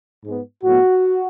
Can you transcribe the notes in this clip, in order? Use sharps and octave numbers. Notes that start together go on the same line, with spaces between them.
G#2 G#3 B3
A2 F#3 B3 F#4